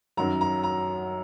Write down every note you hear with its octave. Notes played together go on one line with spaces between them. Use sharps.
F#2 D#3 F#3 A#5
A#5
A#5